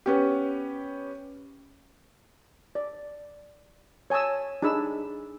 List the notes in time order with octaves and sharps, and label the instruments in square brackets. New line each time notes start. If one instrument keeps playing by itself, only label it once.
[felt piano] B3 C#4 G4
[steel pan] D5
C#5 G#5 A5 D#6 E6
D4 D#4 G#4 B5 E6